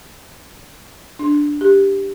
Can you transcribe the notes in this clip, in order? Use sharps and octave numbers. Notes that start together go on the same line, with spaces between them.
D4
G4